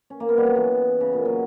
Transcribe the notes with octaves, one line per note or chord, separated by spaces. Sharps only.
C#4
A#3
B3
G3
F#3
E3
C#3
A#2
F#3